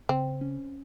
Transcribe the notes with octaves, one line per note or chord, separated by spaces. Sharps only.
C#3 C4
C#4